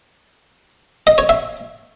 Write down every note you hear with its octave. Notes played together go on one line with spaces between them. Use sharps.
D#5
C#5
E5